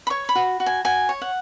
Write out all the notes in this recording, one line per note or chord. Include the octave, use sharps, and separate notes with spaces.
B5
C#5 C#6
B5
F#4
F#4
G#5
F#4 G#5
C#5
F#5